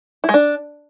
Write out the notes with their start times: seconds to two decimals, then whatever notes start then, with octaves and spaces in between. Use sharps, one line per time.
0.24 E4
0.29 G#3
0.34 D4